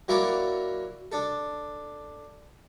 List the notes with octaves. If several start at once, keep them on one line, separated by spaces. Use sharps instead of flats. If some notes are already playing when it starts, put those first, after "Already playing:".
F#3 A#3 E4 A#4 C#5 D5
D4 A4